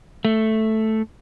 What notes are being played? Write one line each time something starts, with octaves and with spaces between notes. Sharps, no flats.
A3